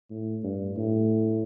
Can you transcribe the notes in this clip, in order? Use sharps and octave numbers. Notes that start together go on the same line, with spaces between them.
A2
G2
A2